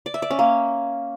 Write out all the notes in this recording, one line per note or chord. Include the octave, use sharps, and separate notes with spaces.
D5
E5
D5
C#4
A#3